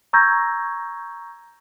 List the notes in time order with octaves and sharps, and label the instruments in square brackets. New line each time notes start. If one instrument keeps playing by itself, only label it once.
[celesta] A#5 C#6 E6 G6 G#6 A#6